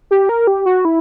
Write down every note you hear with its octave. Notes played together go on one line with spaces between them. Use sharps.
G4
A#4
G4
F#4
E4